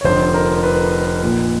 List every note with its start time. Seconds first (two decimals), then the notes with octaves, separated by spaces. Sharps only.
0.01 C#5
0.04 F1 F2 D3 C5
0.34 A#4
0.63 B4
1.22 A#1 A#2